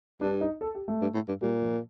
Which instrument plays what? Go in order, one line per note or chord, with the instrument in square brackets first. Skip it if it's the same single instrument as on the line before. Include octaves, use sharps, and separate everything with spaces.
[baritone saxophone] G2 [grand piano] D4
[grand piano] D#4
A4
G4
A3
[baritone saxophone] G2
A2
G2
[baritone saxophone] A#2 [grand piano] G3
[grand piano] F3